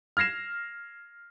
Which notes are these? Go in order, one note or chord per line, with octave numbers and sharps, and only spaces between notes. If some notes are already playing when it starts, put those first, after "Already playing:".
F6 G#6 A#6 C7 E7